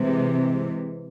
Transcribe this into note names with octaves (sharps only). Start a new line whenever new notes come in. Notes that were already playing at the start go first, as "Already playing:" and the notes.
Already playing: C3 E3 G#3